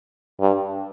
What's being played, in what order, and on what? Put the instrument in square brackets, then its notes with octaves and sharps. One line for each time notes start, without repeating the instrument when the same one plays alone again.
[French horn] G2